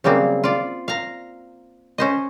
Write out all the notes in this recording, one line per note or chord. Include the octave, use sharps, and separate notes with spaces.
C#3 F#3 G3 A#3 C4
F4 D5
F5 A#5
C#4 C5 D#5